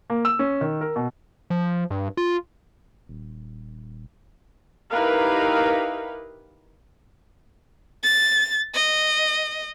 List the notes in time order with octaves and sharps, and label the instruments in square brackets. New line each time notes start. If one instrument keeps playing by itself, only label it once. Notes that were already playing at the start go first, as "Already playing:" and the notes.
[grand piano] A#3
E6
C#4
D#3
A#4
B2
[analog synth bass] F3
G2
F4
D#1
[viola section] D#4 E4 G4 A#4 B4 F5
[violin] A6
D#5